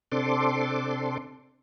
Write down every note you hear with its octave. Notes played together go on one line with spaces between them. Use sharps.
C3 C4 D4 A4 C6 D6